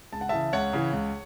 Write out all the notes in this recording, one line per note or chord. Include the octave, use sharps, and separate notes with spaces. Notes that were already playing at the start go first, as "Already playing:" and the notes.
C#2 A5
F#5
C#3 E3 E5 A5
C#2 C#5 F#5
C#3 E3
C#2